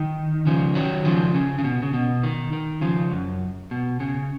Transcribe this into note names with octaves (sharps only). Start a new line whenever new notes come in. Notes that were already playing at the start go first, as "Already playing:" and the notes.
Already playing: D#3
C#3 F3
D#3 F#3
C#3 F3
C#3
C#3
B2
C#3
B2
D#3
D#3
C#3 F3
F#2
B2
C#3